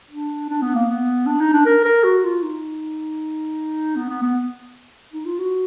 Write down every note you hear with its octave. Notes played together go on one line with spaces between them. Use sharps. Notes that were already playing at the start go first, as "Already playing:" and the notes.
D4
D4
B3
A#3
B3
D4
D#4
D4
A#4
A#4
F#4
F4
D#4
B3
B3
B3
D#4
F4
F#4